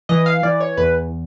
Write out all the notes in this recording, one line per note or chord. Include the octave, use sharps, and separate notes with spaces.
E3 D#5
F5
E3 D5
C#5
E2 B4